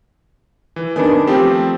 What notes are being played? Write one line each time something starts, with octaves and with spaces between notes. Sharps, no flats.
E3
D#3 B3 D4 G#5
F3 A3 C4 G4